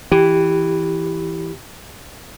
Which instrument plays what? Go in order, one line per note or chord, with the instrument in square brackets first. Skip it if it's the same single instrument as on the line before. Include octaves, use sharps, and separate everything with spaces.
[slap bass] E3 [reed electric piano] G4